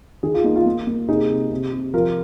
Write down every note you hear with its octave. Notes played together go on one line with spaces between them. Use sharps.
D#3 G#4
F4
A#3 D#4
F4
A#3
A#3
C3 D#4 G#4
C3
C3
C3
F3 F4 A#4